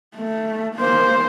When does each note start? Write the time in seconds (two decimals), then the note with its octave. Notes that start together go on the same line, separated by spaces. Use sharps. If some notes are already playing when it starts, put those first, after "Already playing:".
0.16 A3
0.76 A#3 C5